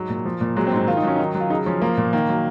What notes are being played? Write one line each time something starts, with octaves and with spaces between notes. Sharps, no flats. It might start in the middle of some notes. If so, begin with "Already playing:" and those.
Already playing: G#2 F#3
A#2
F3
A#2
F#3 G#3
C4
G#2
C4
D#3 F4
D#4
F#3 C#4
D#3 D#4
F#3
F4
C#3 D#4
F3 C#4
F3 A#3
A#2
D#3 A#3
F#3